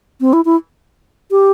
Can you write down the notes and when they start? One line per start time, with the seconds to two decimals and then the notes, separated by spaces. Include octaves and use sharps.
0.21 C4
0.33 E4
0.45 E4
1.31 G4